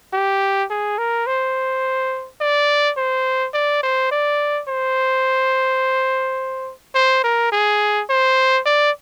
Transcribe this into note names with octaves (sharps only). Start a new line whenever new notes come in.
G4
G#4
A#4
C5
D5
C5
D5
C5
D5
C5
C5
A#4
G#4
C5
D5